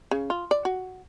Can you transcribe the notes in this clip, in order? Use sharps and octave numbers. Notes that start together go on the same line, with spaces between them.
C#3
F4
D5
F#4